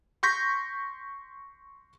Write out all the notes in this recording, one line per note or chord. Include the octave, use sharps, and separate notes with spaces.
C6 C#6 G6 A#6 B6